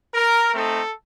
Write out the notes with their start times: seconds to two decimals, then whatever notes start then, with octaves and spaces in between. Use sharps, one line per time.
0.15 A#4
0.54 A3 C4 D#4 A4